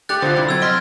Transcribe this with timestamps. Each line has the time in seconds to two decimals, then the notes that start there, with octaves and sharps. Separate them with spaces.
0.09 A3 G4 D5 F#6 A6
0.22 D3 G#3 C4 F4 C5
0.36 C2 E4
0.49 F#3 C4 E6 G#6
0.62 D#5 C6 F6 A#6 B6 D7